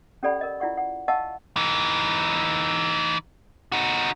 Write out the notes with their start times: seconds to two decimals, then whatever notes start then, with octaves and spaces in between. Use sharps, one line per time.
0.23 C#4 G4 A4 D5 F#5 B5
0.41 A#4 D#5
0.60 E4 F4 D5 F#5 C#6
0.78 F#5
1.08 D#5 F5 F#5 A5 C#6 E6
1.56 E3 D#4
3.72 D#4 F#4